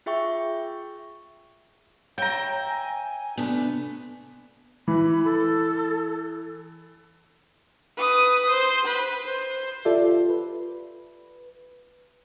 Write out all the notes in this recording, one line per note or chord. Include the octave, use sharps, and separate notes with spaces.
F4 G#4 E5 G5 C#6
C#5 E5 G5 A#5
G#5
C3 A3 B3 D4
E3 B5
A4
B4 D#6
C5
B4
C5
F4 G4 A4 D5 E5
B4